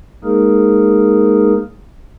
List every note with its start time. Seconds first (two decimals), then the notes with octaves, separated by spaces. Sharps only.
0.24 G#3 A#3 D#4 G#4 A#4